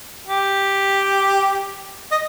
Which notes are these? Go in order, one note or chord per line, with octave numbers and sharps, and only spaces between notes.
G4
D#5